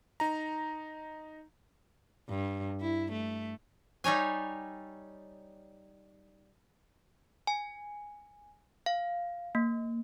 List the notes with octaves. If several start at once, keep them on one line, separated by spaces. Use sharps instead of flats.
D#4 A#5
G2
E4
A3
G3 D#4 C#5 G#5
G#5
F5
A#3